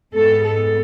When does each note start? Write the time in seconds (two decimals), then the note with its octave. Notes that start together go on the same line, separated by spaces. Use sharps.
0.14 G#2 G#3 B3 A4
0.45 A4